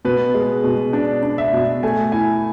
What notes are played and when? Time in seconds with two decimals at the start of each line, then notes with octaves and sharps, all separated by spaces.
0.05 B2 B4
0.34 G#3
0.64 B2
0.93 D4 D5
1.23 D4
1.38 E5
1.53 B2
1.83 A3 G#5
2.12 E4 G#5